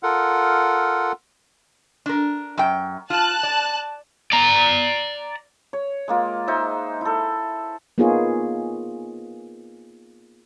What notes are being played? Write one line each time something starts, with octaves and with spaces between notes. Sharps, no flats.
F4 A4 A#4 F#5
D4 A#4
F#2 G5
F4 A5 F#6
D5
D5 A#5
C#5
G#3 A#3 F4
G#3 D#4 C5 E5
E4 A4
A#3 B3 D#4 F4 G#4 C#5